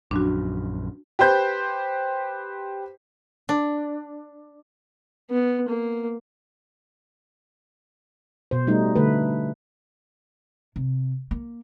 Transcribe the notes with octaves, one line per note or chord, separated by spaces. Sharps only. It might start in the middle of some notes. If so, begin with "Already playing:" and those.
A#1 F#2 D4 F#4
G4 B4 C5 G6
D4
B3
A#3
B2 C5
G3 A3 D#4
D3 A3 B4
C3
A#3